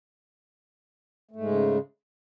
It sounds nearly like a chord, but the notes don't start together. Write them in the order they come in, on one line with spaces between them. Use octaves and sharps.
A3 G#2 G#3 C#3